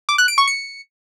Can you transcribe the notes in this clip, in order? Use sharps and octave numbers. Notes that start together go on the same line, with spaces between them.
D6
F#6
D7
C#6
C#7